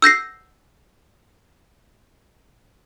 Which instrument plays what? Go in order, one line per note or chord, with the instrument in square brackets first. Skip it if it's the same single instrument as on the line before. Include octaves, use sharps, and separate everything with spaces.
[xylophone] E6 G6 A#6 C7